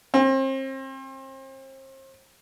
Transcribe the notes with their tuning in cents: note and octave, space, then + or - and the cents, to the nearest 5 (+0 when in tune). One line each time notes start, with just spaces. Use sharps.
C4 +35